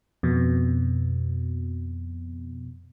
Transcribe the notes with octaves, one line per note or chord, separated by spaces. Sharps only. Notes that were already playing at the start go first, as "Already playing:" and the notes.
F2 B2